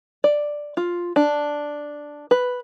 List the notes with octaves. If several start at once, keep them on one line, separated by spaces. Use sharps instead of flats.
D5
F4
D4
B4